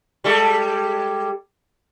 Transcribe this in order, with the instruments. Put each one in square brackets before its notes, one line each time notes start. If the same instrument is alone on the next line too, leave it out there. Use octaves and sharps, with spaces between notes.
[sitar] G3 G#3 A4